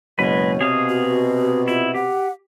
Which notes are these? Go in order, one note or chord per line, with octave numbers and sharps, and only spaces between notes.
F#1 B2 G#3 B4 C#5
C3 G#4 F5 D#6
F#4
E4 F4
G4 F#5